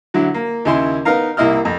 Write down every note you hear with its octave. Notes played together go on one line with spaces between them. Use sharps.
D3 F#3 E4
A#3
D#2 C#3 E4 C6
B3 D#4 A#4 F5 A#5
C2 A#3 E4 D#5 F6
F2